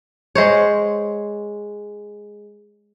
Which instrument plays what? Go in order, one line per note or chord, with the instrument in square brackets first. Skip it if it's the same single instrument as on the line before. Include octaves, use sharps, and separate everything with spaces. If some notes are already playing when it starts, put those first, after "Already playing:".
[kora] G#3 C5 C#5